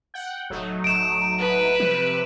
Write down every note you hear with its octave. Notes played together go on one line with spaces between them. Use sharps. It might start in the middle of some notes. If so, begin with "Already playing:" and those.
F#5 G5
D1 F#3 A3 D#4
D1 D7 E7
B4
C3 F3